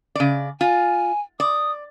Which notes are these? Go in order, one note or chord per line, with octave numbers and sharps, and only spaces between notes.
C#3 D5
F4 G#5
D5 D#6